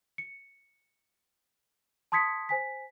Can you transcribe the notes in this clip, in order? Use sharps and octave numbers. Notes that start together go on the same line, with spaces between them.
C#7
A5 C6 D#6 G#6 B6 C#7
C5 G#5 B6